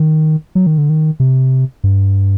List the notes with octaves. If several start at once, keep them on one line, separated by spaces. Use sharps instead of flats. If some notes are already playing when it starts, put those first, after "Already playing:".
Already playing: D#3
F#3
D#3
D3
D#3
C3
G2